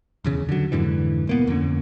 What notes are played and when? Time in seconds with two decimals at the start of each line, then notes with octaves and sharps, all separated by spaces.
0.24 D#1 E2 C#3
0.49 D3 F#3
0.72 F2 G#2 D3 E3
1.27 E1 A#3 B3
1.47 F2 D3 A#3 C#4